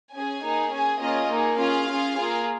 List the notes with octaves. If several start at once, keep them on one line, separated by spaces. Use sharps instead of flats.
C#4 G#4 G#5
A#3 D#4 G#4
C#4 G#4 G#5
A#3 C#4 F4 G#4 D#5
A#3 D#4 G#4
C#4 F4 G#4 F5
C#4 F4 G#4
A#3 F4 G#4